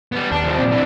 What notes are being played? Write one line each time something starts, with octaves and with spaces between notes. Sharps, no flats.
G3 B3
D#2 D4
C2 F3
A#2 C4 D5
D3 E3